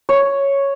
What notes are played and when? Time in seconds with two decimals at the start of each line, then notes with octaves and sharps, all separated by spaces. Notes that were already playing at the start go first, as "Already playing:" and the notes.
0.09 C#5